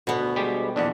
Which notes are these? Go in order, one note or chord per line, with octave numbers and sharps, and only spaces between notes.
D2 B2 B3
G3 G#3 G4
A#1 E2 D4 F#5